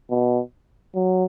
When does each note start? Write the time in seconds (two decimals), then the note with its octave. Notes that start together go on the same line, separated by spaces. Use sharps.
0.10 B2
0.95 F#3